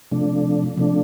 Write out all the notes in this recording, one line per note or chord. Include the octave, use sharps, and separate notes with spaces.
C3 F3 A3 D4
C3 F3 A3 D4